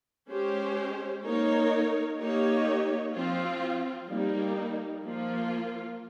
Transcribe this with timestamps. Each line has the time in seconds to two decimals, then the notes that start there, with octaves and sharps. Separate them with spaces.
0.31 G#3 C#4 G4 C5
1.26 A#3 D#4 A#4 C#5
2.21 A#3 D#4 G4 C#5
3.15 F3 C4 F4
4.10 G3 A#3 D#4
5.04 F3 A#3 F4